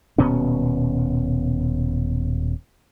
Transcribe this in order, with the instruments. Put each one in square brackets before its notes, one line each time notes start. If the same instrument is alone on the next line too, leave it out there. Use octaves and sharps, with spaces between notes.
[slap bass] D#1 B2 B3 C#4